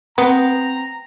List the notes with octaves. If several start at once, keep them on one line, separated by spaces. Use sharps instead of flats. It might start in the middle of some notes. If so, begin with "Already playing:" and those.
B3 C4 A#5